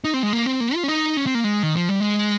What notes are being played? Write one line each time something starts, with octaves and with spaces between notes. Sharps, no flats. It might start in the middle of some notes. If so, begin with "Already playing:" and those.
D#4
C4
G#3
A#3
C4
A#3
F4
C#4
D#4
C#4
C4
A#3
G#3
D#3
F3
G3
G#3